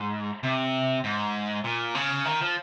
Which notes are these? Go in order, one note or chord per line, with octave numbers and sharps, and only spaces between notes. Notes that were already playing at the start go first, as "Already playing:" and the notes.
Already playing: G#2
C3
G#2
A#2
C#3
D#3
F3